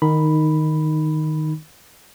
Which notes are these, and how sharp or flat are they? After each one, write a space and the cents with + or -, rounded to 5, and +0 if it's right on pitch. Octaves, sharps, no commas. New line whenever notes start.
D#3 -10 D#4 +0 B5 +0